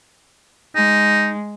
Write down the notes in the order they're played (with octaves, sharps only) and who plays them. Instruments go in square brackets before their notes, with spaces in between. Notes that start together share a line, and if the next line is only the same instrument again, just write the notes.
[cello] G#3 [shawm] D#4